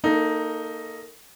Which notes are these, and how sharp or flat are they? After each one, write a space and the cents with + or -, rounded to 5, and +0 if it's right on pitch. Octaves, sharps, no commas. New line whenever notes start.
A#3 -20 D#4 +0 A4 +0